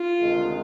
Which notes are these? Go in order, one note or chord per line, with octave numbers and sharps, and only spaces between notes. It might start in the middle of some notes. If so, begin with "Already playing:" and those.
Already playing: F4
D2 C3 D#3 G#3